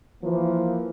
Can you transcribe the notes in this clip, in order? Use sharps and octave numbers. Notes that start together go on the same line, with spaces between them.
E3 F3 A#3